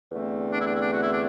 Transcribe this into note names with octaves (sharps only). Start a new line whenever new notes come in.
E2 D3 A3 C4
D4
E4
D4
E4
D4
F#4
E4
D4